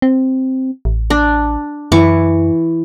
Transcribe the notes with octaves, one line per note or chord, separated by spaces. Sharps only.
C4
A1
D4
F#2 E3 C#6 D6